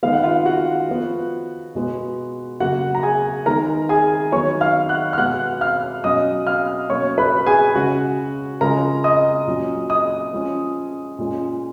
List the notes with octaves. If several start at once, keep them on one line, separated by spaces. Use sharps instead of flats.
D#3 G#3 B3 F5
F#5
F4 F5
F#4 F#5
F3 B3
B2 G#3 B3
C#3 F#3 A#3 F#4 F#5
A#5
G#4 G#5
D#3 G#3 B3 A#4 A#5
G#4 G#5
D#3 F#3 B3 C#5 C#6
F5 F6
F#5 F#6
F6
B2 G#3 B3 F#5 F#6
F5 F6
B2 F#3 C#4 D#5 D#6
F5 F6
B2 F#3 A#3 C#4 C#5 C#6
B4 B5
G#4 G#5
C#3 G#3 C#4 F#4 F#5
C#3 F3 G#3 C#4 A#4 A#5
D#5 D#6
A#2 F#3 C#4
D#5 D#6
F3 G#3 C#4
A#2 G#3 C#4